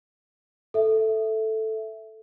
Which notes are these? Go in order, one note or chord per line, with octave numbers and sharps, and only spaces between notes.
A4 E5